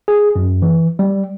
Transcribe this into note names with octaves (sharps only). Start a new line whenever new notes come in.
G#4
F#2
E3
G3